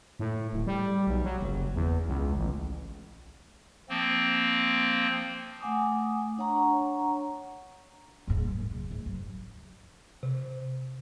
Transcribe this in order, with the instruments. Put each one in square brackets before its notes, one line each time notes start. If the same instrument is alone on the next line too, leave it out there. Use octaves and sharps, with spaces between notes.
[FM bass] A2
D1
G3
B1
F#3
F#1
E2
C#2
A1
[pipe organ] F3 A#3 C4
[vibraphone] A3 F#5 G#5 D6 D#6
D4 C#5 F#5 A#5 C#6
[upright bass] D#1 G#2
F#2
C#2
G#2
F#2
[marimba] C3